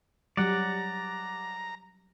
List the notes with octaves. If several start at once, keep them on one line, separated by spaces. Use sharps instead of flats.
F#3 G3 D5 F#5 A#5